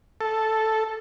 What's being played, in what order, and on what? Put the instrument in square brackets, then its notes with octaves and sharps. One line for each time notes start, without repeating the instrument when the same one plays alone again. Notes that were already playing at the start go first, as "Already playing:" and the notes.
[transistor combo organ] A4